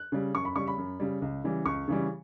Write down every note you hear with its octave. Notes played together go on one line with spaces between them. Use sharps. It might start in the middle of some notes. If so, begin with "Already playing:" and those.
Already playing: F#6
C#3 G3
F#2 C#6
B5
C#3 G3 C#6
B5
F#2
C#3 G3
C#2
C#3 E3 G3
C#2 C#6
C#3 E3 G3